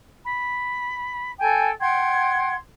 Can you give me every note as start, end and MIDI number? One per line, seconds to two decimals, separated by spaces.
0.24 1.30 83
1.39 1.70 69
1.39 1.70 79
1.39 1.70 80
1.80 2.53 78
1.80 2.53 79
1.80 2.53 84
1.80 2.53 92